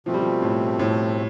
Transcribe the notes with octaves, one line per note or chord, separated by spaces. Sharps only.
B2 F3 A3 C4
G3
F3
A2
A2